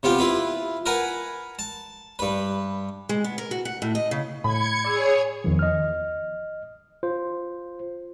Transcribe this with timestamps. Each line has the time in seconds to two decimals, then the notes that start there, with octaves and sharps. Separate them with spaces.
0.03 C3 B3 F4 G4
0.19 E4 F4 B4
0.86 A#4 B4 F#5 G#5
1.59 A5
2.19 G2 B4
3.09 G#3
3.24 B3
3.38 A#4
3.51 F#4
3.65 F#5
3.82 A2
3.95 D#5
4.11 C#3
4.44 A2 B5 G#6 C#7
4.85 G#4 C#5 D5 E6
5.44 E2 D#3 F3
5.59 D#5 F6
7.03 F4 C5